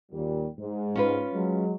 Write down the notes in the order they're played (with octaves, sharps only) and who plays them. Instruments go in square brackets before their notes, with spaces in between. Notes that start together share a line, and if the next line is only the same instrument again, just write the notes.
[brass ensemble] D#2 A#2 G3
G#2
[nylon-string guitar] C#4 F4 B4
[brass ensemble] F#3 G#3